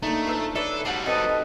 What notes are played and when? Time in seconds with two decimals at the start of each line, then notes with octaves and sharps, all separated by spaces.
0.02 A3 A#3 D4 D#4
0.27 F4 B4 C5 E5
0.55 D4 A4 B4 C#5 E5 G#5
0.85 G3 F#4 C5 F#5 A5
1.06 C4 D#4 A4 B4 D#5 A5